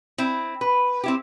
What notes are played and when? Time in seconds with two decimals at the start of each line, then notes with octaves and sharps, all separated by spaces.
0.18 C4 E4
0.61 B4
1.04 C4 E4 G4